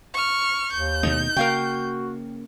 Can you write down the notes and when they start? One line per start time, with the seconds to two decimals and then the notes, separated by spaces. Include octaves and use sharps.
0.14 C#6 F6
0.73 D#2 G6
1.03 B2 D#3 A3 D#4
1.36 C#3 A#3 F#4 A#4 F5 G5